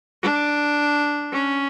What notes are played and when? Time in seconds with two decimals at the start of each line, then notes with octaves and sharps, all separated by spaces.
0.23 D4
1.33 C#4